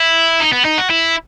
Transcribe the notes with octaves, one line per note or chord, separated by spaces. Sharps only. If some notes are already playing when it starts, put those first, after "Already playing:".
Already playing: E4
D#4
B3
D#4
F#4
E4